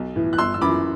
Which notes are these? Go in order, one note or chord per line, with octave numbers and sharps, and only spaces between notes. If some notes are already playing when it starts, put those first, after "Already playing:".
Already playing: B1
A2 E3
F#6
G1 C6 E6
E6
F#2 E3 B5 D6